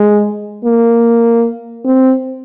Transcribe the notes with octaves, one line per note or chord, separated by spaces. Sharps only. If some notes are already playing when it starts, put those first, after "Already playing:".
Already playing: G#3
A#3
C4